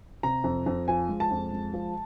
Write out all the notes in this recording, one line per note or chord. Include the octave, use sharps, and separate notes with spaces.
C3 A#5
F2
F2
F3 G#5
G#3
A5
F2
G#3
F3